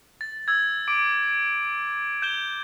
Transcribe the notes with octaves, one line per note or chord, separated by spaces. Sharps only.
A6
E6 G#6
D6 D7
G6 E7 G7